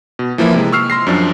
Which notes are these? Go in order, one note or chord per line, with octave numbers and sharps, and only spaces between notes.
B2
E3 F3 A#3 E4
C3 G#3
C#6 E6 F6 C7
C6 A#6 C7
F#2 F3 D4